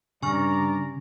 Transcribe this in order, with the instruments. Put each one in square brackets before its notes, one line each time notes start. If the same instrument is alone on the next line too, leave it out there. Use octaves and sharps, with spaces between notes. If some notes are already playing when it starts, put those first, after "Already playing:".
[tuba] G2 [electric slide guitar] C#3 [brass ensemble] D5 A#5 [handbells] G#5 C#6 F6